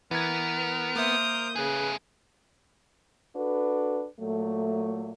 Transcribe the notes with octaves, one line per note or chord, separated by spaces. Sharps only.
E3 B3 A#4 A#5 G#6
A#3 C5 E5 D#6 G6
C#3 A3 G#4 B4
D4 F#4 A4 B4
A#2 F#3 A3